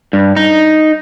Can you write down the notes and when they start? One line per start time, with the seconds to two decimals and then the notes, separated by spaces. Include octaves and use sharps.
0.13 G2
0.37 D#4